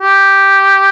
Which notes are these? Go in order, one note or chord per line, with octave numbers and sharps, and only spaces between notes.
G4